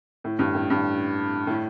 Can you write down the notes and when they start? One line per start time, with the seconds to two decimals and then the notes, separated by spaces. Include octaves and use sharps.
0.24 A2
0.39 G2
0.54 A2
0.70 G2
1.47 A2